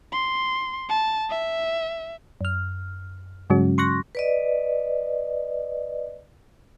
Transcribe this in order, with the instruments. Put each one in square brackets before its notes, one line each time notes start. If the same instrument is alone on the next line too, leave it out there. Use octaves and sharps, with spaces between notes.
[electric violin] C6
A5
E5
[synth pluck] F#2 F6
G2 C#3 F#3 G#3 C#4 F#4
C6 C#6 F#6 A#6
[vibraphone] B4 D5 D#5